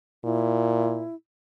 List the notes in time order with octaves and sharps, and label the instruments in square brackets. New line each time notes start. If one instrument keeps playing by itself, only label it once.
[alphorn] A#2 [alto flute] E4